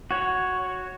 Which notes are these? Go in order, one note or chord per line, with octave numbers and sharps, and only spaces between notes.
F#4 C#5